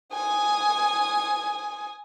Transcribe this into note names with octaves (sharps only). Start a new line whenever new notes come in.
G#5 D#6